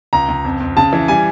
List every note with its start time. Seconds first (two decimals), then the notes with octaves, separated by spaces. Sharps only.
0.13 C#2 A#5
0.28 C#2
0.45 F2
0.60 F2
0.77 C#3 A5
0.93 E3
1.08 G3 G#5